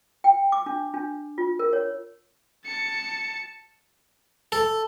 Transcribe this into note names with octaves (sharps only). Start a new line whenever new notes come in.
G5
D6
D4
D4
F4
A#4
C#5
A5 C#7
A4